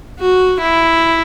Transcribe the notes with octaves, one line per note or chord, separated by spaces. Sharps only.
F#4
E4